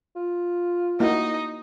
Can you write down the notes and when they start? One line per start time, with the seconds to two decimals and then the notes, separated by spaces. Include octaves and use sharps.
0.16 F4
1.00 A#3 D#4 E4 F#4